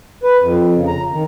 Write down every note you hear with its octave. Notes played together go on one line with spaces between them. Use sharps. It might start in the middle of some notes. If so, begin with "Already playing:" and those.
B4
F2
C#3
A#5
D#3